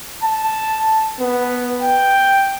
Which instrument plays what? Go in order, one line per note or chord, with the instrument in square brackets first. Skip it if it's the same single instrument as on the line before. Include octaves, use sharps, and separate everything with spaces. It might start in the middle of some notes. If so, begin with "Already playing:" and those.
[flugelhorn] A5
B3
G5